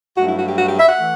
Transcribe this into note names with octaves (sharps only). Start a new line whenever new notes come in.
G2 F#3 A3 F#4
E4
F#4
G4
F#4
G4
E5
F#5
E3 A3